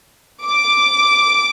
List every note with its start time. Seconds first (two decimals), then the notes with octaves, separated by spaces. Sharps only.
0.45 D6